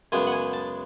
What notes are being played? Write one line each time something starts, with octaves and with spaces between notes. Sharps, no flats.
F#2 C#3 G#3 B3 G#5
F#5
G#5
A5